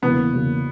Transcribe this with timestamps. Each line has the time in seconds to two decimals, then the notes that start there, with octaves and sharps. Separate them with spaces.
0.02 E2 C#3 F#3 A#3 B3
0.32 E2 C#3 F#3 A#3